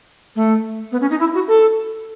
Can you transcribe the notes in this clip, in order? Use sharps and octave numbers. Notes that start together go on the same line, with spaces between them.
A3
B3
C#4
D#4
E4
F#4
A4